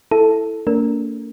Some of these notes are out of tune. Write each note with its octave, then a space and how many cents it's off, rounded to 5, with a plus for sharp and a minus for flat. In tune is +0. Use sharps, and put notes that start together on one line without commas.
E4 +0 A4 +0
A#3 -35 D4 -45 A#4 +0